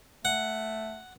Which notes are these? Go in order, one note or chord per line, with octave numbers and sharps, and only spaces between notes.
A3 F#5